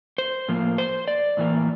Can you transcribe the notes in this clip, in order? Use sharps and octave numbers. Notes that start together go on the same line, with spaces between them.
C5
A2 F3 A#3
C5
D5
A2 E3 A#3